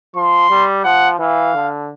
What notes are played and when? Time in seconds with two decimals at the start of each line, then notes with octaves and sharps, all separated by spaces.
0.16 F3 C6
0.50 G3
0.85 F3 F#5
1.19 E3 F5
1.55 D3